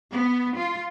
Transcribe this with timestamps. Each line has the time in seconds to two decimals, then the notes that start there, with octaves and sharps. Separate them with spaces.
0.11 B3
0.57 F4